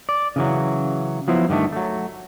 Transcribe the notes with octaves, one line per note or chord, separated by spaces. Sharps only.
D5
C#3 E3 F#3
F3 F#3 B3 E4 C5
G2 D3 D#3 A3
F#3 A3